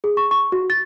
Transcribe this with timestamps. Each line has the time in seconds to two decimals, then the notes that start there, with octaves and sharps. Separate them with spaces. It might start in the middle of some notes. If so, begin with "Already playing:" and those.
0.04 G#4
0.17 C#6
0.31 C#6
0.52 F#4
0.70 A6